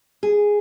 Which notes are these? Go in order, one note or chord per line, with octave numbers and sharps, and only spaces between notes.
G#4